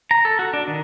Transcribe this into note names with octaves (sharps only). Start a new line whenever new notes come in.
A#5
A4
F#4
D4
D#3